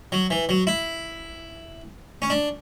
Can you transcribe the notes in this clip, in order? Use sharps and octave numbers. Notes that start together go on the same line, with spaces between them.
F#3
E3
F#3
E4
C#4
D4